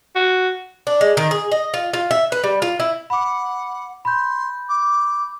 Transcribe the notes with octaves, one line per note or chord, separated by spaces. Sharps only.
F#4
D4
G#3
D#3
G#4
D#5
F4
F4
E5
B4
G3
F4
E4
F#5 B5 D6
B5 C6 G6
D6